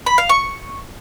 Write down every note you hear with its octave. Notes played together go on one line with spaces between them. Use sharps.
B5
F5
C#6